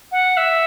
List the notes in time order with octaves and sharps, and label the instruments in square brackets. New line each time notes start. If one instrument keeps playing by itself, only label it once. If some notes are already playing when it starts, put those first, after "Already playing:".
[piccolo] F#5
E5